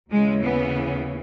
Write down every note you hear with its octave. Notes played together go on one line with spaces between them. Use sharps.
D#2 C#3 E3 G#3
B3